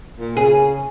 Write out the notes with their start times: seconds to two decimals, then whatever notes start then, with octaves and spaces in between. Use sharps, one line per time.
0.19 A#2
0.37 C#3 G#4